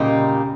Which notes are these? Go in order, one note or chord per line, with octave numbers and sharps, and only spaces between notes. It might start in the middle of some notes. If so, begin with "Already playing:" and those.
Already playing: A#2 C#3 G3 A#3 D#4